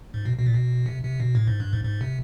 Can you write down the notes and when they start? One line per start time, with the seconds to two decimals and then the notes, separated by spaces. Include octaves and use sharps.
0.14 G#2
0.25 B2
0.38 B2
0.46 A#2
0.54 B2
0.86 C3
1.03 C3
1.20 B2
1.35 A2
1.48 G#2
1.60 G2
1.73 G#2
1.84 G#2
2.01 C3